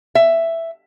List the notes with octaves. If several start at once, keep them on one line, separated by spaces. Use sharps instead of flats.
E5